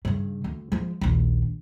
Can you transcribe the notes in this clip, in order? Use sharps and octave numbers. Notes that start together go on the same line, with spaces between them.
G2 C#3
D2
F3 G#3
A#1 D#2